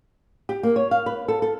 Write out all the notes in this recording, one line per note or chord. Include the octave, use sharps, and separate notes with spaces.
G4
A#3
C#5
F5
B4
A4
A4